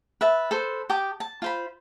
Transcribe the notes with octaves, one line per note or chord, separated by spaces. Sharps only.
B4 E5 A5
A4 B4 C5
G4 A5 D6 D#6
A5
F4 C5 B5